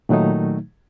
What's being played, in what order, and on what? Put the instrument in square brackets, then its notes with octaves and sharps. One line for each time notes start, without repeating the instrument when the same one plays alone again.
[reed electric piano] A#2 D#3 F#3 A3 D#4